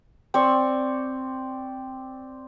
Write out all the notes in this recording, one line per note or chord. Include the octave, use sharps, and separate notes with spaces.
C4 D5 C#6